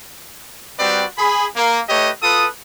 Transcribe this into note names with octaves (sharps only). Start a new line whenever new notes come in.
G3 C4 F#4 B4 D5
G#4 B5
A#3
A3 G4 B4 C#5 D#5
F4 A4 B4 D#6